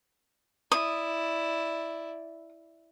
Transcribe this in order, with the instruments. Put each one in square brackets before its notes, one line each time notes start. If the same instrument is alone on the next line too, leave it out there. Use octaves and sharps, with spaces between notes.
[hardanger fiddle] E4 D5 [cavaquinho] D#6